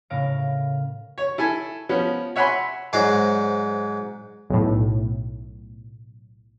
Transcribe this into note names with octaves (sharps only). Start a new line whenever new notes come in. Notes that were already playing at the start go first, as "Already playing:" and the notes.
A2 C#3 A#4 F5 A#5 D7
C#5
E4 A4 G#5
F3 B3 C#4
C#5 E5 F#5 G#5 B5 C6
G#2 F#3 C5 D5
B1 A2